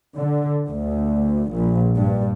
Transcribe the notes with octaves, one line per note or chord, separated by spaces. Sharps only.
D3
D2
A#1
G2